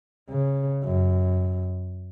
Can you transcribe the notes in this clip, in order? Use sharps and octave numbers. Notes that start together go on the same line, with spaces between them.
C#3
F#2